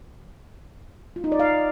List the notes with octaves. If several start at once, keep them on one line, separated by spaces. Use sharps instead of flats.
F4
D#4
D5
F5